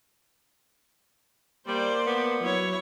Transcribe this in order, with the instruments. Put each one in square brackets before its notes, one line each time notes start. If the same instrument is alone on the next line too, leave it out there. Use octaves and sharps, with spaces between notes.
[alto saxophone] G3 [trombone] A#3 [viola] C5 D5
[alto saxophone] B3
[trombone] F#3 [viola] E4 C#5